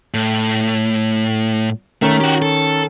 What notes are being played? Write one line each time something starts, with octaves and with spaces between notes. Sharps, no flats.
A2
D#3 A3 C#4 A#4
F#4 G4
A4